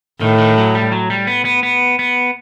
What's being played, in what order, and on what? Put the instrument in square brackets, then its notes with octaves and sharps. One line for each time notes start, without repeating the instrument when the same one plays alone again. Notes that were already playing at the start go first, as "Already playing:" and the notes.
[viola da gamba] A2 [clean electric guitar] D#3
[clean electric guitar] D#3
F#3
G3
F#3
G3
B3
B3
B3
B3